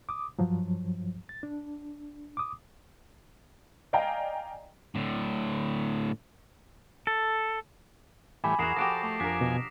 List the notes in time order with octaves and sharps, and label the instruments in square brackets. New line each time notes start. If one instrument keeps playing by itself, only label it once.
[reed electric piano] D6 D#6
G2 F3 F#3
A6
D4
D6 D#6
[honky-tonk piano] D5 D#5 F5 G5 G#5 A#5
[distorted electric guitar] A2 D3
[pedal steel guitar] A4
[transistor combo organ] A2 E3 G3 [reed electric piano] G#5 B5 [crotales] D6
[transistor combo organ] E2 F#5 [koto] F#4 G#4 A#4 [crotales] D#6 C7 E7
[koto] F3 F#4 G4 [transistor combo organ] A4 [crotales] A#6 D7 E7
[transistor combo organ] A3
[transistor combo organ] F2 G#5 [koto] D4 A#4 [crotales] B6
[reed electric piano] B2